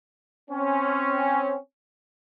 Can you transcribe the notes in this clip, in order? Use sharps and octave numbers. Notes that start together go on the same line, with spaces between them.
C4 C#4